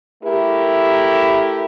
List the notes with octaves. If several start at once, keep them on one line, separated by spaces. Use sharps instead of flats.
A3 E4 G4 A#4